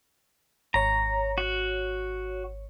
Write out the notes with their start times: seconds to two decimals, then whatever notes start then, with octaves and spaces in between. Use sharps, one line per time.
0.74 G#1 C#5 A#5
1.38 F#4